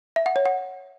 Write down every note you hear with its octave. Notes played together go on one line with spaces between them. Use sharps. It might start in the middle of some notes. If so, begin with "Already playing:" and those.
E5
F#5
C#5
F#5